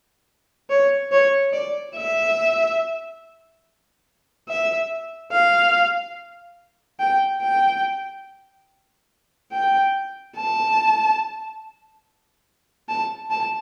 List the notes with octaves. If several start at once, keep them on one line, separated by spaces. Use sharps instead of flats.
C#5
C#5
D5
E5
E5
F5
G5
G5
G5
A5
A5
A5